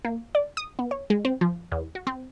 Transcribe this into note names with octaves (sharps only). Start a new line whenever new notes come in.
A#3
D5
D#6
B3
C#5
G#3
C4
F3
E2
F#4
C4